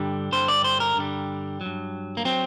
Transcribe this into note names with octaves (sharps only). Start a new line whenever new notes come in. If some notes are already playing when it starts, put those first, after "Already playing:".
Already playing: G2 D3 G3
G2 D3 G3 C5
D5
C5
A#4
G2 D3 G3
F#3
G2
A#3
F#3 C4